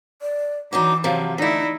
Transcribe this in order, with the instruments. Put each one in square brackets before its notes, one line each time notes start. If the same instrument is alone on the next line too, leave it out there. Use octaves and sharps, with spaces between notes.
[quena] D5
[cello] E3 [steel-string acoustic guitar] F#3 D4 D#4 [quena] D6
[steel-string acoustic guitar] C3 F3 F#3 [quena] F5
[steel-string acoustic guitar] D3 A3 [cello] D#4 E4 [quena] D5